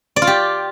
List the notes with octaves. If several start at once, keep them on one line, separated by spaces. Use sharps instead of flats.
D5
F4
G4